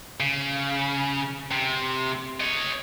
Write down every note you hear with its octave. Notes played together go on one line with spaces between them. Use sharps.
C#3
C3
C#5 D#5